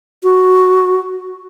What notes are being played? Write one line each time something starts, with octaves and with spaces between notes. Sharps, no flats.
F#4